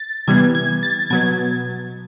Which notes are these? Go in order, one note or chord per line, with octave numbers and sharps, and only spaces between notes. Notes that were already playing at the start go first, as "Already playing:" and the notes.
Already playing: A6
C3 E3 G3 B3 G#6
G#6
A6
B2 F#3 B3 G#6